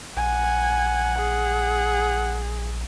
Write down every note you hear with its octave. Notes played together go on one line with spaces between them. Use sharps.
A#1 F#5 G#5
G#4